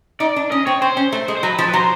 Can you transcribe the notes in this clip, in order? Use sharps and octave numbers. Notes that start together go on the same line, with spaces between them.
D#4 D5
D4
C#4 D#5
C4 C#5
C4 C5
C#4
A3
G#3
C5
F#3 B4
F3
B4
F#3 C5